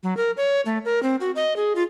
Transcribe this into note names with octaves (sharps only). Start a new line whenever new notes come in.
F#3
A#4
C#5
A3
A#4
C4
F#4
D#5
G#4
F4